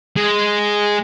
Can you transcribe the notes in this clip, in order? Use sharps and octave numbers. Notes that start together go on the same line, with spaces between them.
G#3